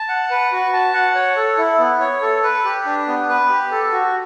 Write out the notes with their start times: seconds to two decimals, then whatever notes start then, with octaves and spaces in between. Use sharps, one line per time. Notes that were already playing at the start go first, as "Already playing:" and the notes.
Already playing: A5
0.09 F#5
0.31 B4
0.52 F#4
0.73 A5
0.94 F#5
1.15 C#5
1.37 A4
1.58 E4
1.79 B3
2.00 C#5
2.22 A4
2.43 B4
2.64 G4
2.86 D4
3.07 B3
3.29 B4
3.49 G4
3.71 A4
3.92 F#4